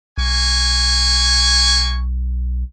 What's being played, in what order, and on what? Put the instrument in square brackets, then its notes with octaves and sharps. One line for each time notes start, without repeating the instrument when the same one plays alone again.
[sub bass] B1 [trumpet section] A#3 G#5 C#6